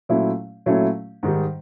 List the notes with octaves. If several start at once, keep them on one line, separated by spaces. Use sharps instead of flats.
A#2 F#3 A3 C#4 E4
A#2 F#3 A3 C#4 E4
G#2 D#3 G3